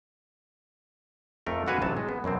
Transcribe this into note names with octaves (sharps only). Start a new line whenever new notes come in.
F2 A3 A#4
D3 B3 F#4 B4 F5 G#5
A1 C3 F#3 A5
G#3
B3
F#2 B2 F#3 C4